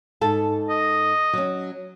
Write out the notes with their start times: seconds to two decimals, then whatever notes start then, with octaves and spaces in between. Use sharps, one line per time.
0.21 G#2 A4 A5
0.70 D#5
1.33 F#3 C#4